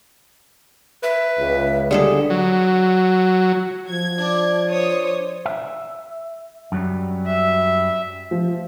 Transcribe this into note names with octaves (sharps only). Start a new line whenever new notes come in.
B4 E5
C#2
D3 G3 G#4 A4
F#3
F3 G#6
D4
C5 C#5 D#6
E5
F#2 F#3 G3
E5
F3